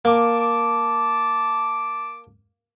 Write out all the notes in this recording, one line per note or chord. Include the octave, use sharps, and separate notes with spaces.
A#3 A5 D6